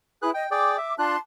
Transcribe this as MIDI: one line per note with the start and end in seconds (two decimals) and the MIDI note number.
0.22 0.32 64
0.22 0.30 68
0.22 0.30 71
0.22 0.30 90
0.34 0.45 75
0.34 0.49 79
0.51 0.77 68
0.51 0.77 74
0.51 0.77 79
0.51 0.93 86
0.78 0.95 76
0.99 1.16 62
0.99 1.16 65
0.99 1.17 81
0.99 1.17 84
0.99 1.16 90